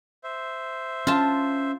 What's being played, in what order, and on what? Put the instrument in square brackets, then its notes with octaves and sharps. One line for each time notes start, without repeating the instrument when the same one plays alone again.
[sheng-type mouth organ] C5 E5
[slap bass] C#4 [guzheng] F4 A5